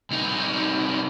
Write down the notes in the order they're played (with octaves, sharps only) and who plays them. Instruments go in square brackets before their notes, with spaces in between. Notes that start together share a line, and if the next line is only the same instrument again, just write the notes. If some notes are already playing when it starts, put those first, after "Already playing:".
[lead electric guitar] C2 D#4